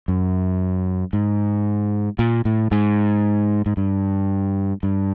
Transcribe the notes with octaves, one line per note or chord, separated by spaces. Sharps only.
F#2
G#2
A#2
A2
G#2
G#2
G2
G2